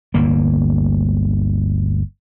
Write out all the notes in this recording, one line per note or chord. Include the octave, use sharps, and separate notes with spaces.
G1 D2 A#3